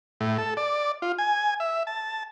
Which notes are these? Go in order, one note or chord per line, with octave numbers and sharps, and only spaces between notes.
A2
A4
D5
F4
G#5
E5
A5